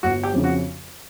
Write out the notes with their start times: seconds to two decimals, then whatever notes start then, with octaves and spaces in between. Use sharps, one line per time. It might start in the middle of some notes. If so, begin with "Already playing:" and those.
0.03 G1 F#4
0.23 G4
0.34 F2 C#3
0.44 F#4